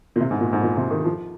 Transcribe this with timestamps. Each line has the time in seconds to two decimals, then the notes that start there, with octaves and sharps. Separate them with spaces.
0.16 A#2
0.20 C3
0.31 G#2
0.41 A#2
0.53 G#2
0.63 A#2
0.77 C3
0.91 D#3
1.05 F3